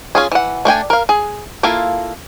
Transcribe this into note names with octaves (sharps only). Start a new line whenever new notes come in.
C#4 F4 G#4
E3 F#5
A3 D4 G5 G#5
A#4 F5
G#4
A#3 E4 F4 A4 F5